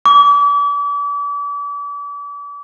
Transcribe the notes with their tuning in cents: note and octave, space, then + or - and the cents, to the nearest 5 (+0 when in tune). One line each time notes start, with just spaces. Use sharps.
D6 -40